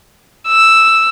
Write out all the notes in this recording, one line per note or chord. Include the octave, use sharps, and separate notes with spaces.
E6